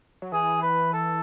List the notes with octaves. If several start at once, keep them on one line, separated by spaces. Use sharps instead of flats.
F#3
E3 G#4
B4
A4